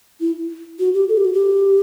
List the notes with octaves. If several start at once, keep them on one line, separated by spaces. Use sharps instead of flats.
E4
F#4
G4
A4
G4
F#4
G4